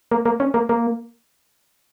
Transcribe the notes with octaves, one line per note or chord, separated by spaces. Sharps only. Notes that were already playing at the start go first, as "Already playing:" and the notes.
A#3
A#3
C#4
A#3
A#3